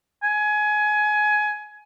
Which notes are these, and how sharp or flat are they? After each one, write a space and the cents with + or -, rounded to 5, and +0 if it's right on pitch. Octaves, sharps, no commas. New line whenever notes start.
G#5 +20